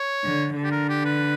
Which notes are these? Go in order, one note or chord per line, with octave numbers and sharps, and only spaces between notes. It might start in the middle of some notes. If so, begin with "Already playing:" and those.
Already playing: C#5
D3
D3
G4
A#4
G4
B4